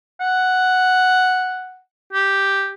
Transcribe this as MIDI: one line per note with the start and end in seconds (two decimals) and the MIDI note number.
0.20 1.79 78
2.13 2.70 67